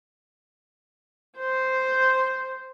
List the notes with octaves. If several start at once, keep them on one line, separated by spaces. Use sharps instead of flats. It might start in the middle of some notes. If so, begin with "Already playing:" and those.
C5